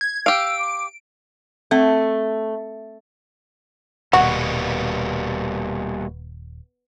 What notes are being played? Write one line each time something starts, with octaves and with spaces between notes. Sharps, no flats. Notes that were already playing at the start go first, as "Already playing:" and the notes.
G#6
G4 F5 E6 D7
D6
A3 C4
D#1 B2 G3 A#3 B3 F#4